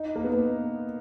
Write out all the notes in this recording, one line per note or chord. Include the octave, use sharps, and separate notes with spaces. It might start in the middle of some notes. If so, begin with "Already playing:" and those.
Already playing: D#4
A#3
B3